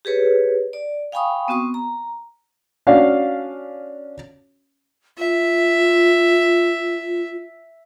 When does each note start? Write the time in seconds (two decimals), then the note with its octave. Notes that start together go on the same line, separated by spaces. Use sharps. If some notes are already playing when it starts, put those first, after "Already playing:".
0.05 G4 G#4 B4 C#5
0.73 D5
1.12 F5 G5 G#5 B5 C#6 D#6
1.48 B3 C4 F#4 C#6 D#6
1.74 A#5
2.87 C#4 D4 F#4 F5
5.18 F4 E5